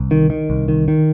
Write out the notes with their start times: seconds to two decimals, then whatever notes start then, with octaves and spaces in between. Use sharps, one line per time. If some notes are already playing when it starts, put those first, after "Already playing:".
Already playing: C2
0.11 D#3
0.30 D#3
0.50 C2
0.68 D#3
0.88 D#3